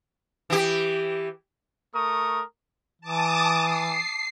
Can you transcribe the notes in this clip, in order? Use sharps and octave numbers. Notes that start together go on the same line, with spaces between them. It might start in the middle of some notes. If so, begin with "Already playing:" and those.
E3 G4
A3 A#4 C#6 D#6
E3 A5 D6 D#6
C7